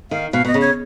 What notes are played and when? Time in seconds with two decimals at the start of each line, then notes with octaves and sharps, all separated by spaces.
0.11 D#3 F5
0.32 B2 F5
0.45 B2 D#5
0.54 C#3
0.61 C#5